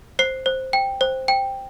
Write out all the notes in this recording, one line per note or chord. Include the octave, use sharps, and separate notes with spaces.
C5 C7
C5
G5
C5
G5